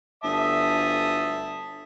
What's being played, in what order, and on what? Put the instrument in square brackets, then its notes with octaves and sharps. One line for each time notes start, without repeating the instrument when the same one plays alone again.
[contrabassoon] G1 [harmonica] E5 A5 D#6